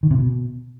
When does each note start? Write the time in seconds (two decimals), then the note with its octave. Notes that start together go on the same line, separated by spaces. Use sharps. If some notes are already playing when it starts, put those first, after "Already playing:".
0.03 D#3
0.11 C3
0.18 B2